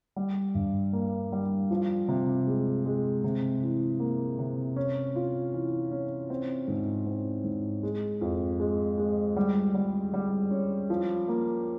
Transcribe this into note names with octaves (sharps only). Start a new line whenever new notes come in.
G3
G2
A#3
G3
F3
C3
G#3
G#3
C3
E3
A#3
C3
C#4
F4
E3
C#4
C4
G#2
C4
G#2
G#3
F2
G#3
G#3
G3
G3
G3
C#4
F3
A#3